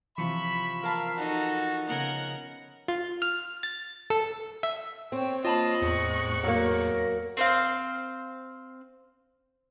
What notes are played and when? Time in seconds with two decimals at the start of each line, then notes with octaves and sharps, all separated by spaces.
0.18 C3 E3 F3 E5 B5 C#6
0.83 A#4 F5 A5 B5
1.18 D#4 F#4 A4
1.87 C#3 B3 D#4 A#4 F#5
2.88 F4
3.22 F6
3.63 A6
4.10 A4
4.63 E5
5.12 C4 C#5 G5
5.45 A#3 F4 C#5 D#5 F5 A5 B5
5.82 E2 A2 C#6 F#6
6.44 F#3 A#3 A#4
7.37 C4 C5 F5